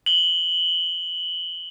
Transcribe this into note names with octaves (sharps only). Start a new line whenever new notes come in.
F#7 G7